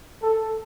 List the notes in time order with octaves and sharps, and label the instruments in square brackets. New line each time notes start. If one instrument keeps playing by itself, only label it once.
[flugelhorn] A4